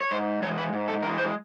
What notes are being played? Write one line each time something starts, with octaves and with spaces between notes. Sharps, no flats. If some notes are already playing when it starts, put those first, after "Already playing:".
C#5
G#2 C5
E3 G#3 C#5
B4
G#2
A4
E3 G#3 A#4
C5